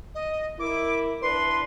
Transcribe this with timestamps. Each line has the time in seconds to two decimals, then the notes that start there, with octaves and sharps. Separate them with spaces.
0.14 D#5
0.59 E4 A#4 D6
1.22 D4 E4 B4 C6